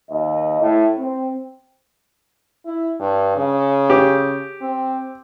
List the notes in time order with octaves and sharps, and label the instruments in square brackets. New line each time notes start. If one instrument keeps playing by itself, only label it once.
[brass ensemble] D#2 D#5
A2
C4
[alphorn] E4
G2
C#3
[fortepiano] G4
[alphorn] C4